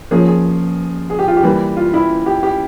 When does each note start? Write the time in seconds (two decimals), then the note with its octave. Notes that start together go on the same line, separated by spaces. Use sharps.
0.11 F3 A#3 C#4 G#4
0.27 G#4
1.10 G#4
1.19 G4
1.28 F4
1.37 G4
1.43 E3 G3 A#3
1.76 F4
1.94 E4
2.26 G4
2.43 G4